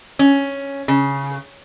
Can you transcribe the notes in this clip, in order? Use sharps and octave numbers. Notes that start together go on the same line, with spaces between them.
C#4
C#3